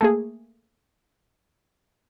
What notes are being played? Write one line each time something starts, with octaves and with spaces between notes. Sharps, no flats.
A3 A#3 G#4